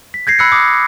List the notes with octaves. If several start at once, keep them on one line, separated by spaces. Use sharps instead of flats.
B6
G6 G#6 A#6 C7
B5 E6 F#6 C#7
D6 D#6